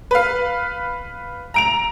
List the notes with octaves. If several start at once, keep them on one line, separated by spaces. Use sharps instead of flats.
B4 F5
A#5 D7 F7